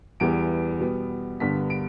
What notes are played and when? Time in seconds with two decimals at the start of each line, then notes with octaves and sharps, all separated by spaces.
0.20 E2 E3 G3 B3 D7
0.80 B2 G3 B3
1.40 G2 D3 B3 B6
1.70 D7